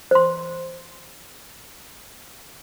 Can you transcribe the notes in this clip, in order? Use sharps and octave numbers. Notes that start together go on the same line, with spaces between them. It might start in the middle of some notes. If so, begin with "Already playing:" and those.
C5 C6